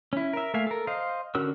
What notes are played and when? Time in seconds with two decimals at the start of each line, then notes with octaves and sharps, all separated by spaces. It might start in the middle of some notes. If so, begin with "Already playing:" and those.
0.13 C#4 E4
0.33 A#4 E5
0.54 A3 A#3 E5 F5 G#5
0.67 A4 A#4
0.87 C5 D#5 F5
1.35 D3 C#4 F#4 A#4 E6